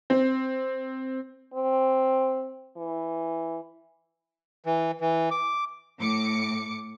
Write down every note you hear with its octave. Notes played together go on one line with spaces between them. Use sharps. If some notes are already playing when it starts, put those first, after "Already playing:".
C4
C4
E3
E3
E3
D6
A2 D6 C#7